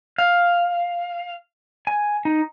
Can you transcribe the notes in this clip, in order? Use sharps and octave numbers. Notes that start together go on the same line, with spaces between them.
F5
G#5
D#4